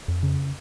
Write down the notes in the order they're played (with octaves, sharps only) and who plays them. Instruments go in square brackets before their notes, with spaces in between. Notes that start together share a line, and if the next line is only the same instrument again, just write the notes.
[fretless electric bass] F2
C#3